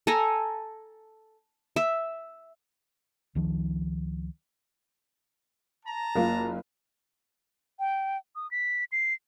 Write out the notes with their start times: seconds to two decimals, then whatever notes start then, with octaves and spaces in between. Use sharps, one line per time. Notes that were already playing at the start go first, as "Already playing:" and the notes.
0.07 A4 G#5 A#5
1.76 E5
3.35 C#2 D#3 F3
5.86 A5 A#5
6.15 F#1 A#3 F4
7.79 G5
8.36 D#6
8.51 B6
8.92 C7